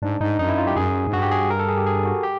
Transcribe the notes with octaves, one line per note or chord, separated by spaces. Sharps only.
G#2 D4
G#2 D#4
F#2 D#4
E4
F4
G4
F#2 G#4
G#2
G2 F#4
G4
G#4
A#4
A4
G#4
G4
G#4
F#4
G4